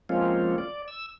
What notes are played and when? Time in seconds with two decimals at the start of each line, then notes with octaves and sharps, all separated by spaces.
0.09 F3 G#3 A#3 C4 C#4 F4
0.58 D5
0.88 E6